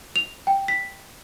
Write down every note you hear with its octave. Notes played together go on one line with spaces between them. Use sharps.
F7
G5
B6